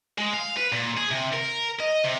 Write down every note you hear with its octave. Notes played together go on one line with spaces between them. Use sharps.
G#3
F5
B4
A#2
G#4
C3
A#4
D#5
C3